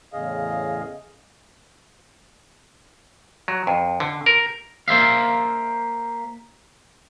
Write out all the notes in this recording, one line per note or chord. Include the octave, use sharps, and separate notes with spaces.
E2 A2 C#3 G#4 D#5 F5
F#3
F2
D3
A#4
A#3 C5 E5 F5